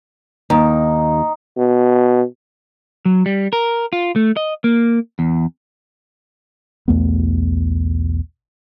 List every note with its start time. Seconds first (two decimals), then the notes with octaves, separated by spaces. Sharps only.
0.50 D#2 D#4
1.58 B2
3.06 F#3
3.26 G3
3.53 A#4
3.93 F4
4.16 A3
4.37 D#5
4.64 A#3
5.19 E2
6.88 B1 E2 A3 B3